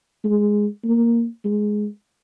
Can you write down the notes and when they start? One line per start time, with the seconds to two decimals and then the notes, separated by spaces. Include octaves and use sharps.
0.24 G#3
0.84 A#3
1.45 G#3